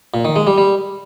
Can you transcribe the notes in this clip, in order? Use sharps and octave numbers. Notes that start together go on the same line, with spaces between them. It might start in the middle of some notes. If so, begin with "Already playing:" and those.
A#2
D#3
G#3
G3
G3